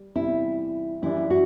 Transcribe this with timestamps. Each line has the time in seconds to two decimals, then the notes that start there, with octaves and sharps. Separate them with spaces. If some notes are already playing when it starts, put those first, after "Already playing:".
Already playing: G3
0.15 E2 C3 G3 E4
1.02 F#2 E3 G3 D4 E4
1.30 F#4